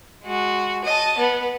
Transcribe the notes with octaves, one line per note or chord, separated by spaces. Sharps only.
G#3 F#4
D#5 A5
B3